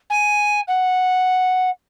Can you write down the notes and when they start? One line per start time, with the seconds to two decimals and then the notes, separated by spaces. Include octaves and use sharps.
0.10 G#5
0.68 F#5